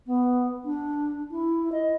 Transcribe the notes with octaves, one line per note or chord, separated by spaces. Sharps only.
B3
D4
E4
D#5